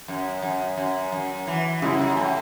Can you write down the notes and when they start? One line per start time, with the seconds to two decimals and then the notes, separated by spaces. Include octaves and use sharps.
0.08 F#2
0.42 F#2
0.78 F#2
1.12 F#2
1.47 E3
1.82 F#2 C#3 G#3 C#4 E4
2.17 A2